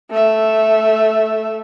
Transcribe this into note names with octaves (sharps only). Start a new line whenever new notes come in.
A3 E5